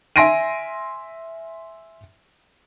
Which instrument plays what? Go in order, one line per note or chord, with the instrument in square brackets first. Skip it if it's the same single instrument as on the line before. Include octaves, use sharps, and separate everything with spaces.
[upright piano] E5 G#5 C6 A#6 D7 D#7